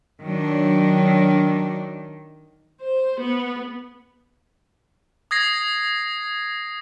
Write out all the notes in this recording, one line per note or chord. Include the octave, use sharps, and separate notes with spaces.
D#3 F#3 D4
C5
B3
D#6 G#6 A#6 C7